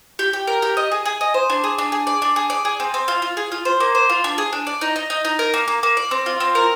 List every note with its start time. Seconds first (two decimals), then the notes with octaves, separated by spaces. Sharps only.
0.19 G4
0.33 G4
0.47 A#4
0.62 G4
0.77 D#5
0.92 G#4
1.05 G#4
1.21 D#5
1.34 C5
1.50 D4
1.64 G#4
1.78 D4
1.92 G#4
2.07 D5
2.22 D4
2.36 G#4
2.50 D5
2.65 G#4
2.80 C4
2.94 C4
3.08 F4
3.22 F4
3.37 G#4
3.52 F4
3.65 C5
3.80 A#3
3.95 C5
4.09 F4
4.24 D4
4.38 G#4
4.53 D4
4.67 D5
4.81 D#4
4.96 D#4
5.10 D#4
5.25 D#4
5.39 A#4
5.54 A#3
5.68 A#3
5.83 A#3
5.97 D5
6.11 C4
6.26 F4
6.40 C4
6.55 A#4